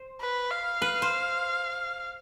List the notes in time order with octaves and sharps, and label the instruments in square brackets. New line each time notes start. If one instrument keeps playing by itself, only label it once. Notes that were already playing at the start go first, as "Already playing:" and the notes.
Already playing: [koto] C5
[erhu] B4
F5
[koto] B4
C5